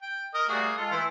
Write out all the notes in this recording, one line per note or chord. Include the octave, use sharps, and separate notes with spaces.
G5
A#4 D#5 D#6
G3 A3 A#3 F#4 G#4
G#3 F4 A4
E3 A3 E4 C6